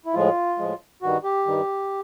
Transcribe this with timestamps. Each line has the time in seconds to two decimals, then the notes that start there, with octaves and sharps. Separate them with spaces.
0.06 E4
0.14 A2 F3 G#3 F4
0.58 A2 F3 G#3
1.02 G2 D#3 G3 F#4
1.24 G4
1.46 G2 D#3 G3